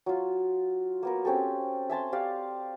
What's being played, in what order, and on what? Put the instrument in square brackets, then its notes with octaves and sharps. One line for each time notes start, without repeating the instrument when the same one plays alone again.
[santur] F#3 F4
A#3 B3 A#4
C4 C#4 G4 A4
E5 G#5 A5 C6
G4 D5 F5